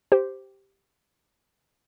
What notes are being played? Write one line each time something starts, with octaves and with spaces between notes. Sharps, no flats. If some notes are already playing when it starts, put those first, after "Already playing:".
G4 C5